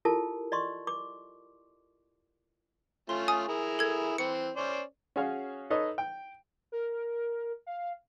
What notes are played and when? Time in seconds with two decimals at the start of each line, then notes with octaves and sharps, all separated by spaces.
0.05 E4 F4 G4 A4 A#4 A5
0.52 D5 D#5 C6 C#6
0.87 D6
3.09 A3 C#4 F4 C6
3.28 G#5 D#6
3.48 E4 G#4 A#4
3.79 A4 G#6
4.18 E3 C4 C#7
4.56 C#4 C5 D5
5.16 C#4 F#4 G#4 C#5 F5
5.70 D#4 A4 B4 C#5 D#5
5.98 G5
6.72 A#4
7.67 F5